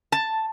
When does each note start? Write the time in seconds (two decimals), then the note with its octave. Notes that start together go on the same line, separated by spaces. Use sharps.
0.12 A5